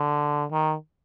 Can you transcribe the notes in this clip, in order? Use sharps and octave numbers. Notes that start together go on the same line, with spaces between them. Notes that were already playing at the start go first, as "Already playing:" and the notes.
Already playing: D3
D#3